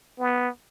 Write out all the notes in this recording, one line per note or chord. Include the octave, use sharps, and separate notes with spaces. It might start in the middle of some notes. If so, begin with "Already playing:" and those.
B3